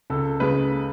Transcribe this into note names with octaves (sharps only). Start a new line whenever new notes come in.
C#2 A4
C#3 G#3 B4